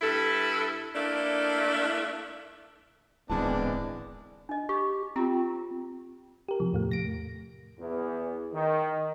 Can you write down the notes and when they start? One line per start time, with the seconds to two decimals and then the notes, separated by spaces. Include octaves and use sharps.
0.02 G2 E4 A4
0.94 A3 A#3 D4 E4
3.30 D1 G#1 E3 G#3 B3 D4 A5
4.49 D4 D#5
4.69 G4 C#6
5.16 C4 F4 G4 A#5
6.48 G4 A#4
6.60 C3 F3
6.73 E2 A2 A3
6.91 A#6 D7
7.80 E2
8.53 D#3